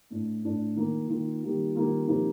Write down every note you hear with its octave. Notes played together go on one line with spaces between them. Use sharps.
A2 A3 D4
A2 A3 D4
D#3 A#3 F4
D#3 A#3 F4
D#3 G3 A#3 F4
D#3 G3 A#3 F4
C3 F3 A#3 D#4